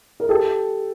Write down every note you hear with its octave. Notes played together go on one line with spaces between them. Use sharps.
A#4
G4 A4